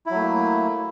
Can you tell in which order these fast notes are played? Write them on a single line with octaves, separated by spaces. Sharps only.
E4 F#3 A3 A#3